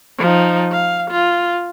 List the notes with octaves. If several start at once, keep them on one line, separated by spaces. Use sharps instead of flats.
F3 D#4
F5
F4